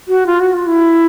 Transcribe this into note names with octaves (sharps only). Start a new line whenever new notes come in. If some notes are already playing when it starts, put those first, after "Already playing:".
F#4
F4
F#4
F4
E4